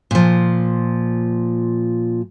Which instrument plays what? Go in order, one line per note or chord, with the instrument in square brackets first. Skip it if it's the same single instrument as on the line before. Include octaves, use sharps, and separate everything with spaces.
[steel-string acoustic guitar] A#2 F3